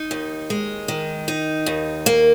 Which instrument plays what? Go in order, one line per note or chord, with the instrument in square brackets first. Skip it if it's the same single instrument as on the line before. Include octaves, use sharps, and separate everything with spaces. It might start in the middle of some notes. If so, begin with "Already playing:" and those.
Already playing: [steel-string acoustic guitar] D#4
D#2
G#3
D#3
D#4
D#2
A#3